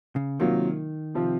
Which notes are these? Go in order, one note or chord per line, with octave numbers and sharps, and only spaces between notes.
C#3
C3 D#3 F#3 A#3 F4
C3 F3 C4 F4